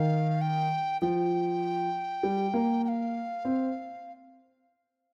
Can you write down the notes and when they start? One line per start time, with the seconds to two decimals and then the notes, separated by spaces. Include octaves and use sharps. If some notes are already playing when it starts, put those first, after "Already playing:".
Already playing: D#3 F5
0.41 G5
1.02 F3 G5
2.23 G3
2.54 A#3
2.84 G5
2.88 F5
3.45 C4